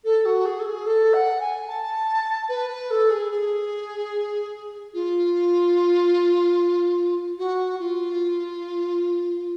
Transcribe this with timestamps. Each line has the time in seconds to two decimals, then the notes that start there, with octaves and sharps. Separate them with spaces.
0.04 A4
0.25 F#4
0.45 G#4
0.59 A4
0.64 G#4
0.86 A4
1.13 F#5
1.40 G#5
1.67 A5
2.48 B4
2.69 B4
2.90 A4
3.10 G#4
3.30 G#4
4.93 F4
7.38 F#4
7.79 F4